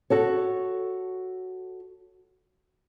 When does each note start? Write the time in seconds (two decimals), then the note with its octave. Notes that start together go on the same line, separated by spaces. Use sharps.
0.10 F#4 A4 C#5